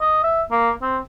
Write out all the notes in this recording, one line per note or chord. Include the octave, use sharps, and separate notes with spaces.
D#5
E5
A#3
C4